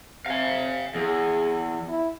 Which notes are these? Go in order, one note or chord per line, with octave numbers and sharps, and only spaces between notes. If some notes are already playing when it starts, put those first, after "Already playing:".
C3 F5 G#5
E2 G#4
E4